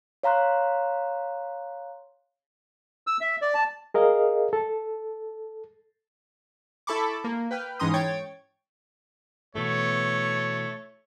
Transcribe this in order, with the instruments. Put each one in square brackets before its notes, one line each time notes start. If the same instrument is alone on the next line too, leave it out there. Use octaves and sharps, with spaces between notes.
[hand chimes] C#5 F5 A#5 C6 F#6
[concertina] E6
E5
D5
A5
[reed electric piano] G#4 A#4 D#5 F5
A4
[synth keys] E4 A4 A5 B5 C#6 D6
A#3
B4 G5 F6
G#2 E3 C#4 A#5 C6 D#6
C#5 G5 G#6 A6
[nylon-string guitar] B2 E3 A4 [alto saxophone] A3 [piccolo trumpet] C#5